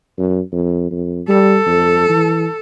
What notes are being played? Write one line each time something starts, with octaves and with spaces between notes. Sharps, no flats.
F#2
F2
F2
G3 A4
F2
E3